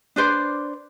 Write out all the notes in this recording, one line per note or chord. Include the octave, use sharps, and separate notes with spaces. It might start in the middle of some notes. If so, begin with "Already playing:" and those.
D4 B4 C5 D5